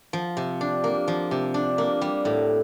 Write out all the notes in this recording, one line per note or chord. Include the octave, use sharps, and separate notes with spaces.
F3
C3
D4
A#3
F3
C3
D4
A#3
G3
A2